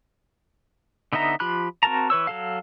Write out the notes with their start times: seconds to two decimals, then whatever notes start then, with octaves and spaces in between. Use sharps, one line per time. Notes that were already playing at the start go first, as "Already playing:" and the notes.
1.13 D3 B3 D#4 E5 A#5
1.40 F3 F4 G4 B5 F#6
1.83 C4 F#4 A#4 A5 A#5
2.10 E3 B4 C#5 E6
2.27 F#3 A4 F5